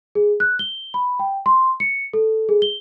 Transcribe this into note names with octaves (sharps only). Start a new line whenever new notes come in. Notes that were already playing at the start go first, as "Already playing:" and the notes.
G#4
F#6
G7
B5
G5
C6
C#7
A4
G#4
G7